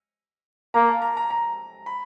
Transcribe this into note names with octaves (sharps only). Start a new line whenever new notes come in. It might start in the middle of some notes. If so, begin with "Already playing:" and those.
A#3 A#5
A5
A#5
A#5
A#5
B5